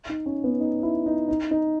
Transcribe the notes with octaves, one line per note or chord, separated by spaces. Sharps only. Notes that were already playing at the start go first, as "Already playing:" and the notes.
D#4
C#4
B3
D#4
E4
D#4
D#4
D#4